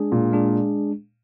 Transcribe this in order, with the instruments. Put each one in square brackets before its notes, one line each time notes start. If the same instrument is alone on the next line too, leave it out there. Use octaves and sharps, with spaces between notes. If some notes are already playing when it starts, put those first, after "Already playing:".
Already playing: [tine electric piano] G#3 D4 G#4
[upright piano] A#2
[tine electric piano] G#3 D4 G#4